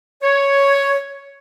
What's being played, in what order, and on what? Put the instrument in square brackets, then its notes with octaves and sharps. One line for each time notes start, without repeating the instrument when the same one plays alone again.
[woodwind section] C#5